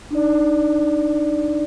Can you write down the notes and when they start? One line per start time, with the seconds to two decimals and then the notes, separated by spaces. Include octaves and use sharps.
0.11 D4 D#4 D5